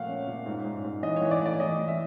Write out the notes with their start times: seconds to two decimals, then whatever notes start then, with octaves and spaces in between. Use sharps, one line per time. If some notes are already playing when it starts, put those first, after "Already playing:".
Already playing: A#2 F3 A3 F5 F#5
0.08 C#4
0.27 A#2
0.46 G#2
0.65 G#2
0.84 G#2
1.03 E3 D#5
1.16 C#5
1.21 E3
1.31 D5
1.40 A3
1.46 D5
1.60 E3 D#5
1.79 E3
1.88 E5